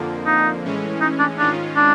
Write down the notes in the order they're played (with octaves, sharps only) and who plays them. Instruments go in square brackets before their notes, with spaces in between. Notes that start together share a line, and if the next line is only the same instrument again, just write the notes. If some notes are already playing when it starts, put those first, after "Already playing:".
Already playing: [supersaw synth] F2 D3 F3 A#3
[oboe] D#4
[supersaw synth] A2 E3 G#3 C#4
[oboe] D#4
D4
[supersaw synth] G#2 D#3 G#3 C#4 F4 [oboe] D4
[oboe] D4